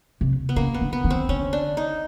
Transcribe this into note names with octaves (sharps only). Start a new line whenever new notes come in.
C3
B3
C#3 A#3
B3
D3
B3
D#3
C4
D3 C#4
D4
D#4